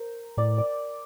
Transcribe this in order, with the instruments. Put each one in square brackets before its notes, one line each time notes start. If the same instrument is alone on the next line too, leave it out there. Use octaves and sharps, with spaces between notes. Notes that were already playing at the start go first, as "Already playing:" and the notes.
Already playing: [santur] A#4 C5
[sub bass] A2 [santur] D5
[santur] D5